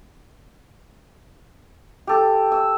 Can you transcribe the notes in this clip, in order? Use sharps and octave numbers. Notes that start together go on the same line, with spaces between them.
G4 A4
E6